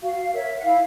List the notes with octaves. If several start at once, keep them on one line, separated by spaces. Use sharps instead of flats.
F#4 F5
A#4 C#5 E5
F#5
E4 F5